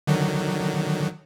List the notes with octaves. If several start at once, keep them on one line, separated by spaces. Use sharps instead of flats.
D3 D#3 F#3